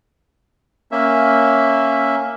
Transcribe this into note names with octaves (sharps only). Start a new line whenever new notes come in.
A#3 C#4 E5